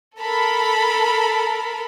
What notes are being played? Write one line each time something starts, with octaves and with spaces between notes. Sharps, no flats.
A4 A#4 A5 B5